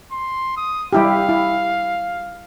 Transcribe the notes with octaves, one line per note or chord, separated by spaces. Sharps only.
C6
D#6
G3 E4 G4 F5
E4